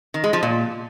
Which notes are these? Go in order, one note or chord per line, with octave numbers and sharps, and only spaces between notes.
D#3
G#3
F3
A#2